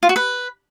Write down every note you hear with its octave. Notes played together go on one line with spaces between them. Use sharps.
F4
F#4
B4